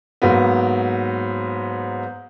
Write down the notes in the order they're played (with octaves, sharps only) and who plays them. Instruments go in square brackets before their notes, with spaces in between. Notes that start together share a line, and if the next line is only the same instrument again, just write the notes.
[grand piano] G#2 F#3 A#3 B3